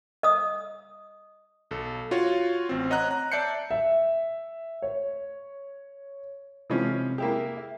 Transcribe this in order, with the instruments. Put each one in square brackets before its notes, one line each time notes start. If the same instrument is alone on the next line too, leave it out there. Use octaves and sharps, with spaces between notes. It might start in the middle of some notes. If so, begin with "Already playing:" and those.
[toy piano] D#5 D#6
[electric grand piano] B1 A4
F4 F#4 C#5
A1 C4
C#5 D#5 F#5 A#5 F#6
A#5
D5 E5 A5 G6 C7 C#7
[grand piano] E5
C#5
[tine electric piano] C3 G#3 C4 [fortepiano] E3 F3 C#4
[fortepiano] A#3 E4 G4 [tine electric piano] G#4
[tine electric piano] E5